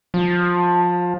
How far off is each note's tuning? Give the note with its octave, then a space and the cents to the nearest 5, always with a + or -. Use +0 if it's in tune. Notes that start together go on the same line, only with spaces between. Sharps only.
F3 +20